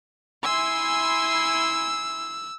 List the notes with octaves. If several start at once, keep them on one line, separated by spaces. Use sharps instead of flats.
E4 G#5 C6 E6